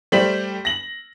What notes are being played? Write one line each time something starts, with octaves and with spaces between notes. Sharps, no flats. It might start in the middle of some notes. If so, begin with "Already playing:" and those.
G3 A3 G4 C5 B6 F#7
A#6 F#7